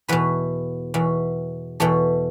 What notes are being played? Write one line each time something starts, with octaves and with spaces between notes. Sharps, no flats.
E2 B2 B4
E2 B2
E2 B2 A4